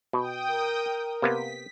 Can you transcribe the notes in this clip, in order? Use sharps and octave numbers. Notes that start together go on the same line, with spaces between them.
B2 G5 D#6
A#4
C3 A#3 B3 B6